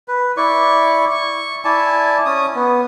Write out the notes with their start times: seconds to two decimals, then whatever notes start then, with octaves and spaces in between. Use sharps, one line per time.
0.08 B4
0.37 E4 D5 C#6
1.11 C#6
1.65 E4 D5 G#5 A5
2.26 C#4 D#6
2.55 B3